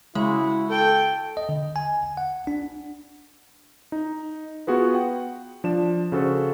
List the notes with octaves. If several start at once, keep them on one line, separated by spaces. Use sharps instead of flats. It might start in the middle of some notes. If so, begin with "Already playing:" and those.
C#3 G#3 E4 F#4
A4 G5
D#5
D3
G#5
F#5
D4
D#4
B3 F4 F#4 G#4 B4
F#5 G5
F3 D4 E7
C#3 F#4 A4 C5